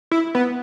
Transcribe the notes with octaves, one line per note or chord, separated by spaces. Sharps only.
E4
B3